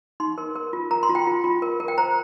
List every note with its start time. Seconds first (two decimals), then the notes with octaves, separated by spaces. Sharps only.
0.20 D#4 C6
0.38 A#4
0.55 A#4
0.73 F4
0.91 A#4 A#5
1.03 C6
1.10 F4
1.15 G5
1.27 F4
1.44 F4
1.62 A#4
1.80 A#4
1.88 G5
1.98 C5 A#5